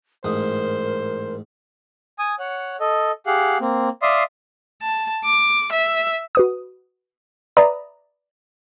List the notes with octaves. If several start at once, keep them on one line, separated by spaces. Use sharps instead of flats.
A1 G#2 A#4 C5 D#6
G#5 D#6
C#5 F#5
A4 D#5
G4 G#4 F5 F#5
A#3 C4
D5 E5 F5 C6 D#6
A5
D6
E5
F#4 B4 D#6
B4 D5 E5 A#5 B5 D#6